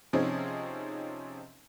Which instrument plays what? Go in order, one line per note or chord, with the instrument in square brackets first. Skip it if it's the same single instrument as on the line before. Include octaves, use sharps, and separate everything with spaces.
[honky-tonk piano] C3 F3 C4 C#4 D#4 G#4